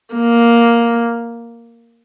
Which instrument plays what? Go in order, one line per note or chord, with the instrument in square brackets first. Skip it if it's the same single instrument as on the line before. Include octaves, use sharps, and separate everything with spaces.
[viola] A#3